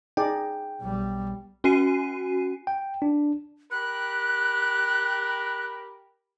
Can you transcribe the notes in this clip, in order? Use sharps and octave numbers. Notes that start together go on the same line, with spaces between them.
D#4 G#4 D5 G5
B1 G3
C#4 F#4 G#5 C7 D#7
G5
D4
G4 A#4 B5 F#6